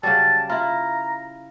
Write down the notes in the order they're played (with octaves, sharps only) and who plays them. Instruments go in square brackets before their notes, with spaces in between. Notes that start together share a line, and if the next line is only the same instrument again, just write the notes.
[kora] C#3 F#3 G3 [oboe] A5
[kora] E4 F4 [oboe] A#5